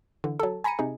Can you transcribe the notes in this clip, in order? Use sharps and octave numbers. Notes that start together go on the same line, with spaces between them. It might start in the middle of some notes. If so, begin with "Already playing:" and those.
D3 E3
F#3 A4
G#5 A#5 B5 A#6 C#7 D#7
C3 D#4 G#4